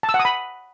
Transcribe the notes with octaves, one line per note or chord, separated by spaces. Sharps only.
A5
E6
F#5
D#6
B5